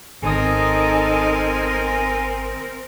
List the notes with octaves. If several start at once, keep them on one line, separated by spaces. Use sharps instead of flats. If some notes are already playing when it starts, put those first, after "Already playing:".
G#1 C4 D#4 A4 A#4 G#5 D#6